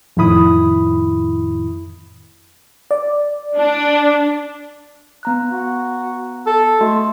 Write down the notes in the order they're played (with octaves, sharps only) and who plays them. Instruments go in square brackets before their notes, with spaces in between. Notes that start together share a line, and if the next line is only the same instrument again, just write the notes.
[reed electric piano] F2 A2 D#3 E4 B5 D#6
[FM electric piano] D5
[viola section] D4
[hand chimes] B3 A#5 F#6
[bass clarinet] F#4
A4
[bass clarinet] A3 [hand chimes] F#4 D#5 C6